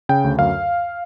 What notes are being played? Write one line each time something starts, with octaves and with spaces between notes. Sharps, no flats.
C#3 G5
D2
F#2 F5